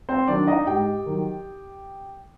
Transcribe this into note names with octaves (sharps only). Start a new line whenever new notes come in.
C4 C5
D#3 F#3 D4 D5
D#4 D#5
G#2 G4 G5
D#3 F#3